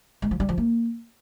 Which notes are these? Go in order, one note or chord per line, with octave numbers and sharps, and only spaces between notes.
G#3
F3
G3
F3
A#3